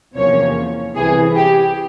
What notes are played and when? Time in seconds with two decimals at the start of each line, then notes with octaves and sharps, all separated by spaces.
0.15 E2 C3 F3 A#3 C#4 C#5
0.95 C2 C3 E3 G#4
1.36 G4